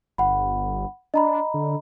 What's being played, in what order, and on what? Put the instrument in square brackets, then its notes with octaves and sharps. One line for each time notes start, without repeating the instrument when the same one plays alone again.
[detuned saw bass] G1 [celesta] F#5 B5
[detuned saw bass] D4 [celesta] D#5 A#5 B5
[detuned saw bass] D3